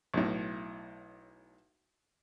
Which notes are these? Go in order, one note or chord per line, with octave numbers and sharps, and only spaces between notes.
B1 A2